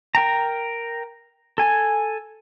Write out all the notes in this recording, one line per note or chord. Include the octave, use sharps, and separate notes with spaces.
A#4 G5 A#5
A4 G#5